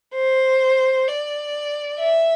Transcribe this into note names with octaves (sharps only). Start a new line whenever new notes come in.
C5
D5
E5